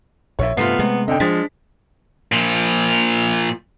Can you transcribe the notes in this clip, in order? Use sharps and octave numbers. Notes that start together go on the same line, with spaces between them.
A#1 A#2 C#5 E5
G2 C3 A3 B3 F4 C7
C3 G#3 A3
D3 C4 D#5 G5
F3 G#3 D4 A6 B6
A#2 F3